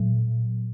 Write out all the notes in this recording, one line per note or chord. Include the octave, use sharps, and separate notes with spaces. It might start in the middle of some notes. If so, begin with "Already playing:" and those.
Already playing: A#2 F#3